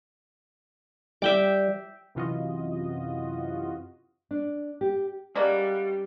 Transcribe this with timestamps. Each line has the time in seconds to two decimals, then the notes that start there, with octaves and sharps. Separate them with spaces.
1.22 G3 E5 G5 D6
2.15 F#2 C3 E3 F4 F#4 D#5
4.31 D4
4.81 G4
5.35 G3 G#3 A#3 C#4 F#4 B4 D5